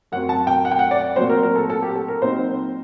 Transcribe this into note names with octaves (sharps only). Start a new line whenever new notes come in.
F#2 F#3 C4 F#5
A5
G5
F#5
G5
F#5
D5
A#2 F#3 C4 C5
A#4
A#4
A4
A4
G4
A4
A#4
A#2 F#3 C4 D#4 C5